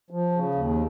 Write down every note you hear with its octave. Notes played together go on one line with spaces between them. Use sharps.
F3
C#3
D#2